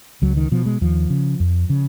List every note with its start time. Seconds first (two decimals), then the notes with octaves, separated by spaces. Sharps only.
0.22 C#2 F#3
0.37 D#3
0.52 B2 F3
0.66 G#3
0.81 D#2 F3
1.10 C#3
1.40 F2
1.70 C#3